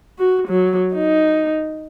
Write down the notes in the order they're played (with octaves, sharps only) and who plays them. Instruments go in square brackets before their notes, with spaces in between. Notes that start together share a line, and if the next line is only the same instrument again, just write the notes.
[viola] F#4
F#3
D#4